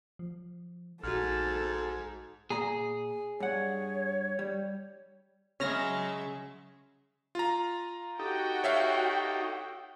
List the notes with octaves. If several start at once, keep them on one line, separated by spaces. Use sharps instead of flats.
F3
A#1 G#2 F#4 A4 F6
A#2 G#4 A#5
G2 C#5 F#5
G3
C#3 F#3 G#3 C#4 E5 F6 A#6
F4 A#5
D#4 F#4 G4 A4 G5
C#5 E5 F5